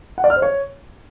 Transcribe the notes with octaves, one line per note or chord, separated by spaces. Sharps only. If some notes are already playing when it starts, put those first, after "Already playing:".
F#5
D5
F6
C5
C#5